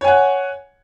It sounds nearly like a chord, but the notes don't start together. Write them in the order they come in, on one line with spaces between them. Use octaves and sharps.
C#5 G#5 F#5